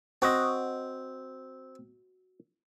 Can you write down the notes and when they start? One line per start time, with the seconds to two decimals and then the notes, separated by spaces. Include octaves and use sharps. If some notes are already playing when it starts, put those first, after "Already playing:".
0.22 C4 F#4 D#5